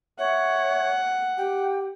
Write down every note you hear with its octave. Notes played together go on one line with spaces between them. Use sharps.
C#5 E5 F#5
G4 G5